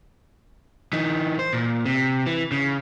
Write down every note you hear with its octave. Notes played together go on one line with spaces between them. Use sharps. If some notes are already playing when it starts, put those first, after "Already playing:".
E3 D#4
C5
A#2
C3
E3
C#3